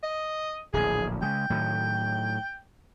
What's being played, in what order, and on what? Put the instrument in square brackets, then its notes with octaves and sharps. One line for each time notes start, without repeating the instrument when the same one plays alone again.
[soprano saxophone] D#5
[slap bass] D1 A#1 [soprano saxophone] G#4
[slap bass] C#3 G#3 [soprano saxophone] G5
[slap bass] A2 D#3 F#3